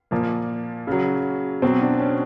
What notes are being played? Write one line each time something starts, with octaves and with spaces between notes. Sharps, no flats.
A#2 F3 A#3
C#3 F#3
B2 F#3 C4
D4
C#4